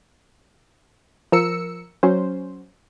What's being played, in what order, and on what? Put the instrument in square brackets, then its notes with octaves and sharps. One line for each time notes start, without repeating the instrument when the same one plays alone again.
[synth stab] F3 A#4 E6 C#7
F#3 C#4 C5